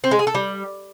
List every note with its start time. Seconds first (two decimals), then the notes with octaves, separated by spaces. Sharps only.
0.04 C4
0.11 G#3
0.19 G#4
0.27 A4
0.35 G3